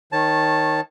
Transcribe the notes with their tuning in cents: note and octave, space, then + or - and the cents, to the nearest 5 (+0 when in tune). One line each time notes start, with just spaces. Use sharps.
D#3 +0 C#5 -20 A5 +0